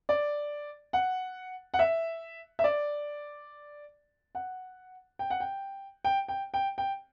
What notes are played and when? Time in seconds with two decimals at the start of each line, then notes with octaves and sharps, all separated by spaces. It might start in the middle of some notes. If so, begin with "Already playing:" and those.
0.09 D5
0.93 F#5
1.74 F#5
1.79 E5
2.59 E5
2.64 D5
4.35 F#5
5.19 G5
5.30 F#5
5.40 G5
6.05 G5
6.28 G5
6.54 G5
6.78 G5